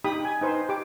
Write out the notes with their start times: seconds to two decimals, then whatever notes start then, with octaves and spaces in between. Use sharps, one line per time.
0.04 D#4 G4 B5 D#6
0.25 G#5
0.41 D#4 B4 C5
0.69 G4 D6